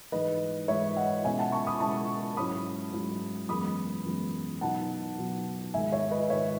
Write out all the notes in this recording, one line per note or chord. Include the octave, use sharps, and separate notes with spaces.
G#2 E3 G#3 D#4 B4 D#5
G#2 E3 G#3 D#4 C#5 E5
D#5 F#5
B2 G#3 C#4 E4 E5 G#5
F#5 A5
A5 C#6
B5 D#6
B2 G#3 C#4 E4 A5 C#6
G#2 F#3 C#4 E4 B5 D#6
G#2 F#3 C#4 E4
F#2 E3 G#3 B3 B5 D#6
F#2 E3 G#3 B3
B2 F#3 B3 D#4 F#5 A5
B2 F#3 B3 D#4
G#2 D#3 G#3 E5 G#5
C#5 E5
B4 D#5
G#2 D#3 G#3 C#5 E5